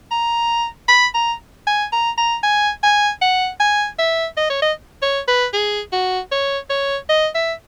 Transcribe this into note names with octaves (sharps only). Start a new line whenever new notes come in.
A#5
B5
A#5
G#5
A#5
A#5
G#5
G#5
F#5
G#5
E5
D#5
C#5
D#5
C#5
B4
G#4
F#4
C#5
C#5
D#5
E5